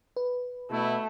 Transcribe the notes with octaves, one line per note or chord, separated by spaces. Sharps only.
B4
B2 A3 E4